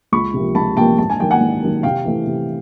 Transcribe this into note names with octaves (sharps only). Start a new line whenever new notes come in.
C#2 B5 C#6
C3 F3 A#3
C#2 A5 B5
C3 F3 A#3 G5 A5
G#2 A5
G#5
D#3 F#3 A#3 G5
F#5 G#5
G#2
D#3 F#3 A#3
C3 F5 G5
E3 A3
C3